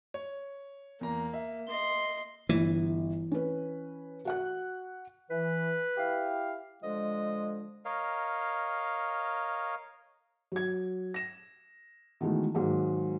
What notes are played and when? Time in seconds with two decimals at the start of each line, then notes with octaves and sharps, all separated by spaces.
0.14 C#5
1.01 E2 A#3 A#5
1.34 E5
1.68 D#5 C6
2.49 G1 E3
3.32 C#4 B4
4.25 F#4 F#5 F#6
5.30 E3 B4
5.97 E4 G4 F5
6.83 D3 F3 G#3 D#5
7.85 A#4 C#5 D#5 F5
10.52 F#3 G#6
11.14 A#6 E7
12.21 B2 D#3 E3 G#3 A3
12.54 G#2 D#3 F#3 G#3 A#3